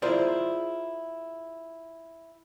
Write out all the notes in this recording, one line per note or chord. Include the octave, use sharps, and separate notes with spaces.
E4 F4 G#4 A#4 C5 D5